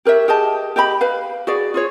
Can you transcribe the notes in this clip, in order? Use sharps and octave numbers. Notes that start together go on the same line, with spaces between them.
G4 A#4 C#5 E5
G4 G#4 D#5 A5
G4 D#5 G5 B5
B4 F5
F#4 G#4 D5
F4 G#4 C#5